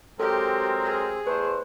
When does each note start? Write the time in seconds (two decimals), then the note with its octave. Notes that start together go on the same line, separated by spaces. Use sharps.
0.20 F#3 G#3 C4 G4 A4 A#4
0.84 G#4
1.27 E2 A3 B4 C5